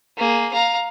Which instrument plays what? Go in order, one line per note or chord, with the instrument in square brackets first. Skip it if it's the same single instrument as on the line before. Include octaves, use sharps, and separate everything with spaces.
[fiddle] A#3 G#4
F5 A#5